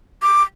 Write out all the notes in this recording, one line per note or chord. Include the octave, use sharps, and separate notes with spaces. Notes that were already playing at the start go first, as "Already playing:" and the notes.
D6